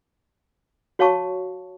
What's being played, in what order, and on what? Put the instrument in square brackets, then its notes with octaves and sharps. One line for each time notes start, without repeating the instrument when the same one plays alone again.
[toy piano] F#4 C#5 F5 A5 C#6